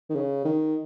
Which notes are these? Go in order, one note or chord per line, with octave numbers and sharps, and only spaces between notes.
D#3
C#3
D#3